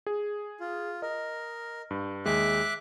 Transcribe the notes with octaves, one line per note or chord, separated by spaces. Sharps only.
G#4
F4
A#4 D#5
G2
D#2 G#3 E5 D6 F#6